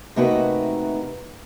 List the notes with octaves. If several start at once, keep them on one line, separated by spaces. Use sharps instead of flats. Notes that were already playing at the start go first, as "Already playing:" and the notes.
C3 A3 A#3 D#4 F#4 B4